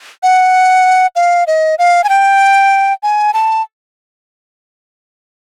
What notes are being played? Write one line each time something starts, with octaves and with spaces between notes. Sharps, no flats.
F#5
F5
D#5
F5
G#5
G5
G#5
A5